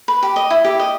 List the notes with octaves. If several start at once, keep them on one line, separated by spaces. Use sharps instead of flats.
B4
G4
D#5
E4
G4
D#5